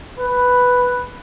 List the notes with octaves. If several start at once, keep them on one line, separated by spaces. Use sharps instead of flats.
B4